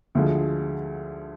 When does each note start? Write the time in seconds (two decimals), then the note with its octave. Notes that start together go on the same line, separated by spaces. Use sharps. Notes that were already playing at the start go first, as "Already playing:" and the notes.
0.15 D2 D3 F3 G#3